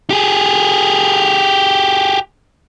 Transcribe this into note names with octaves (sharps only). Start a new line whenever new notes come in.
G4 G#4